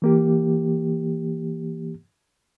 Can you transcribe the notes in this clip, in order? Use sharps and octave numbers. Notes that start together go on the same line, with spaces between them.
E3 A#3 G4